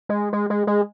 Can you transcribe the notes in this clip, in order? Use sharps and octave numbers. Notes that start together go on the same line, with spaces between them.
G#3
G#3
G#3
G#3